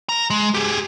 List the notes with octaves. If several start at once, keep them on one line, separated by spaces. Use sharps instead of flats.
A#4 A#5
G#3
G4 G#4